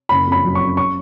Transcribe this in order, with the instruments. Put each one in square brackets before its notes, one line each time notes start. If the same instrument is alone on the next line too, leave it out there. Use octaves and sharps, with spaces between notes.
[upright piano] F#1 B5
F2 B5
F#3
C#3 C#6
C#6